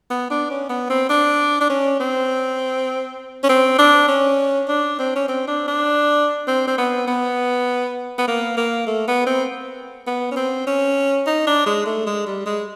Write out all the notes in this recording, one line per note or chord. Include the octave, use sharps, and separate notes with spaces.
B3
D4
C#4
B3
C4
D4
D4
C#4
C4
C#4
C4
D4
C#4
D4
C4
C#4
C4
D4
D4
C4
C4
B3
B3
B3
A#3
A#3
A3
B3
C4
B3
C#4
C4
C#4
D#4
D4
G#3
A3
G#3
G3
G#3